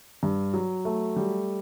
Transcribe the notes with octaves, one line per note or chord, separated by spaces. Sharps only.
G2
F#3
A3
G3